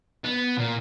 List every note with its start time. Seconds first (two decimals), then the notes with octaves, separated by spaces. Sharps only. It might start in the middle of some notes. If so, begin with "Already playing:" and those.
0.24 B3
0.58 A#2